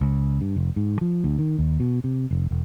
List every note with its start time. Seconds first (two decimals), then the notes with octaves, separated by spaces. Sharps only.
0.01 C#2
0.41 G2
0.56 F1
0.76 G#2
1.01 F3
1.24 D2
1.39 D#3
1.59 D#2
1.80 B2
2.04 C3
2.31 F1
2.51 E1